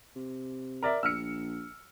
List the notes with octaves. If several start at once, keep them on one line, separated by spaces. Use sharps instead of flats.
C3
A#4 D5 E5
A#1 E6 F6 C#7